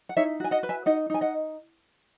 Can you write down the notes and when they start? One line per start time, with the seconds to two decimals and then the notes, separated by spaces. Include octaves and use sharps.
0.09 F#5
0.17 D#4 C#5 E5
0.40 F#4 G#5
0.51 D#5 F#5
0.63 B4
0.69 E5 G#5
0.86 D#4 D#5 F#5
1.10 D#4 G#5
1.21 D#5 F#5